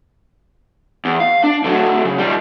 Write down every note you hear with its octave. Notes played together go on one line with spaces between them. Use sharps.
E2
F5
D4
D3 F#3
C#3
D#2 G3